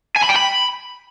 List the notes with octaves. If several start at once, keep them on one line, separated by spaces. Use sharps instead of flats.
G#5
B5
G5
B5